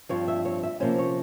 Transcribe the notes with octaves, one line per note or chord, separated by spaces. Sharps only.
G2 F3 C4 C#5
E5
C#5
E5
C3 F3 A#3 C#4 C5
C#5